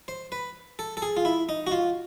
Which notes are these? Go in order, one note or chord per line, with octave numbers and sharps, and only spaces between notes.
C5
B4
A4
A4
G#4
F4
E4
D#4
F#4
F4